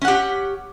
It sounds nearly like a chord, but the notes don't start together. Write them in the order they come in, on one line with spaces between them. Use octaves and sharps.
C#4 F#5 G4